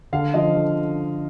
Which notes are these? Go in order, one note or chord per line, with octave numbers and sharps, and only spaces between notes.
D3 F5
F3 D#5
D3